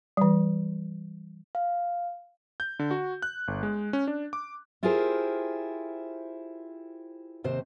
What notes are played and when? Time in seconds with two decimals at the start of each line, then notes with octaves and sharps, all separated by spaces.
0.17 E3 G3
1.55 F5
2.60 G6
2.79 D3
2.91 F#4
3.22 F#6
3.48 G1
3.63 G#3
3.93 C#4
4.08 D4
4.33 D6
4.83 E4 F4 G4 G#4 A#4 C5
7.44 D#2 C3 C5